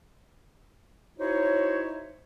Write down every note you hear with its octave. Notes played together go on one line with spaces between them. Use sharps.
D#4 E4 F#4 C5 C#5